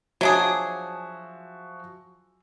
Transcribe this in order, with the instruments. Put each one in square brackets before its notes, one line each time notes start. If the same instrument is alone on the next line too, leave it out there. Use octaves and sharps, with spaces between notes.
[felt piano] F3 F#4 E5 [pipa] F#3 D4 G#4